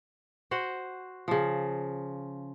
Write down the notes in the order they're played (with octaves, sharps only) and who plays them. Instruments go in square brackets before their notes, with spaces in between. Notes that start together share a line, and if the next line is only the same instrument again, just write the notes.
[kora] F#4 C5 F#5
C#3 F3